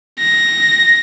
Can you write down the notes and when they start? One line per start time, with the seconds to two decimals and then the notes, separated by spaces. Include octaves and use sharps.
0.20 A#6